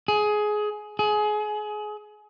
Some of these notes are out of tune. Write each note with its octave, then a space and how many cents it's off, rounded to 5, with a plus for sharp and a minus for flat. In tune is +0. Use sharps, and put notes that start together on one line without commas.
G#4 +15
G#4 +25